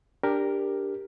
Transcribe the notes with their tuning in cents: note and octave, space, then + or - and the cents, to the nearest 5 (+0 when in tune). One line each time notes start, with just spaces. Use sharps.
D4 +0 G4 +10 A#4 +0